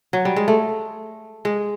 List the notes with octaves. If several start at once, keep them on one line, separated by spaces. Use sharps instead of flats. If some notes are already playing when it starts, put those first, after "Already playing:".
F#3
G3
G#3
A3
G#3